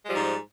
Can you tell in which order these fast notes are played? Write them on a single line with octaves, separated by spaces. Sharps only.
G#3 G3 F3 G#2